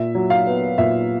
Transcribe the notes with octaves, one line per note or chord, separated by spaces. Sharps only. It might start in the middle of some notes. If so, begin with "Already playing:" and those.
Already playing: A#2 E5
F#3
F5
B3
A#2 E5